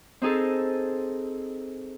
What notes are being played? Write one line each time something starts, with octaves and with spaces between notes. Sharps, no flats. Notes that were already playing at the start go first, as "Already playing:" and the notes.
C4 D#4 G#4 A4